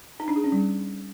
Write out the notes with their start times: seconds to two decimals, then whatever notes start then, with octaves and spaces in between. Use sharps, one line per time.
0.20 D#4
0.28 D4
0.36 G#4
0.44 C#4
0.52 G3